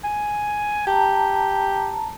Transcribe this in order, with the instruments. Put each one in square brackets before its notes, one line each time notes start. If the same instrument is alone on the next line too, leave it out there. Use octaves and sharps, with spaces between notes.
[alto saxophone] G#5
[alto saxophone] G4 [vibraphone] A5 A#5